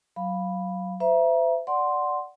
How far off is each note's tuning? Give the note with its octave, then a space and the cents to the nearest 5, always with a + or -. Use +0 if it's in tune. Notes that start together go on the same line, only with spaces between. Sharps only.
F#3 +15 F5 +0 B5 +0
C5 -35 E5 +25 A#5 +35
D5 -5 F#5 +0 C6 +0